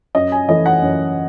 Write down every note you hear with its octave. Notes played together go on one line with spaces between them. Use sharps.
F#2 D#5
G#5
E3 A3 C#4 D#5
F#5
F#2